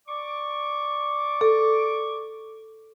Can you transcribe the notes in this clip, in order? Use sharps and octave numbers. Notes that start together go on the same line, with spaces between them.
D5 C#6 D6
A4